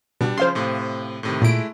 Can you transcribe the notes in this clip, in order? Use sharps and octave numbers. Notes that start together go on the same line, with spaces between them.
B2 G3 D4
C#3 F3 C5 F5 C6
A2 C3
A2 C3 D#3
A#2 G#3 A3 E4 D7